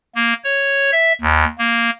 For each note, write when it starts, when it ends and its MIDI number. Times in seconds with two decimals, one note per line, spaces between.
0.15 0.33 58
0.44 0.91 73
0.92 1.13 76
1.21 1.45 39
1.58 1.90 58